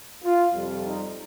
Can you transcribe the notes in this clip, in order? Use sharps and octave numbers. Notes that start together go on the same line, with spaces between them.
F4
F2 C3 G3
D#4